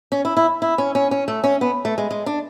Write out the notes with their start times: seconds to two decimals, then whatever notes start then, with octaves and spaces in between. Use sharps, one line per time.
0.12 C#4
0.25 E4
0.37 E4
0.62 E4
0.78 C#4
0.95 C#4
1.11 C#4
1.28 A3
1.44 C#4
1.61 B3
1.85 A3
1.98 G#3
2.11 G#3
2.26 D4